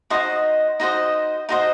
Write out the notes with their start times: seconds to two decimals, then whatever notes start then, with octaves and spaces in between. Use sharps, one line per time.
0.10 D#4 F#4 C5 D#5
0.80 D#4 F#4 C5 D#5
1.49 D#4 F#4 C5 D#5